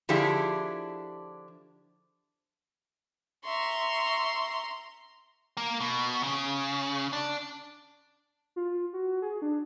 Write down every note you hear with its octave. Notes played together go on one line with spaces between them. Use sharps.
D3 F3 D4 E4 G4 G#4
E5 A#5 C6 C#6
A#3
B2
C#3
D4
F4
F#4
G#4
D4